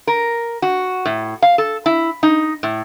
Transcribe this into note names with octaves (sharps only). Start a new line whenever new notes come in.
A#4
F#4
A2
F5
A4
E4
D#4
A2